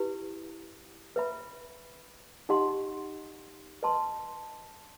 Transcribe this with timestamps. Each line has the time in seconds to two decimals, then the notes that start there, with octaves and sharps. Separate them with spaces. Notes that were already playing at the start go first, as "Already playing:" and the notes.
Already playing: E4 G4 B4
1.16 B4 E5 B5
2.49 D#4 G4 D#5 F#5 C6
3.83 B4 D#5 A5 C6